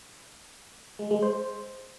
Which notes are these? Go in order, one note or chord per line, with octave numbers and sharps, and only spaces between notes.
G#3
G#3
C5